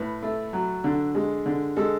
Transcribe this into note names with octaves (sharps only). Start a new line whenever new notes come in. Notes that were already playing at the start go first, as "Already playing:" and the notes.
Already playing: A2 B4
A3
F#3
D3
G#3
D3
G#3 A4